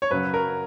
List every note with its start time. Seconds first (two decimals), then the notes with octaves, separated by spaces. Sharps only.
0.02 C#5
0.11 F#2 C#3 F#3 B4
0.34 A#4